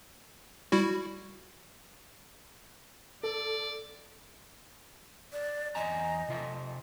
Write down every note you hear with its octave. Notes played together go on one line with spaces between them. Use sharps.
G3 E4 F#4
A4 D5
D5
E2 D#5 G#5 A#5
C3 F4 E5